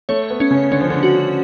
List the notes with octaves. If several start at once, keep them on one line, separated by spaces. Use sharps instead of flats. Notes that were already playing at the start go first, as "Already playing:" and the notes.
A3 C#5
B3
C#4
C#3
D3 C#4
F3
D3
F#4